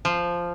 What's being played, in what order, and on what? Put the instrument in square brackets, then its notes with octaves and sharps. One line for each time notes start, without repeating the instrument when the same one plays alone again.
[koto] F3